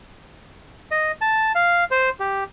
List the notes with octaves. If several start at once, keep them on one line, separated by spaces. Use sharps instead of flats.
D#5
A5
F5
C5
G4